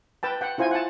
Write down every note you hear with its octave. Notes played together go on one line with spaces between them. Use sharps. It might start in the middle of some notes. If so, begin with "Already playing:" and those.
B4 G5 A5
F#5 G5
E4 F4 C5 G#5
F#5 A5